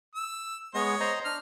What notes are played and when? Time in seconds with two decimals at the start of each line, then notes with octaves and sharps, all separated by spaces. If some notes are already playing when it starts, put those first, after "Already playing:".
0.15 E6
0.74 G#3 B3 C#5 D#5
1.00 C5 D#5 A#5
1.25 D4 F6